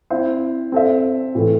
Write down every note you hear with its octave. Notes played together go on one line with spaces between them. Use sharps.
C4 E4 C5 E5
C4 A4 E5
A2 E3 A3